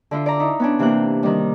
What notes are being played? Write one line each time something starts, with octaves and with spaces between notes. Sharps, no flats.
D3 E4 F4
D5 A#5
D#4 E4
B3 C#4 D4
C3 E3 A#3 G5 F#6
D#3 G3